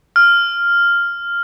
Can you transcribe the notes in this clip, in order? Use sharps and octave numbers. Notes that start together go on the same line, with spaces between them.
F6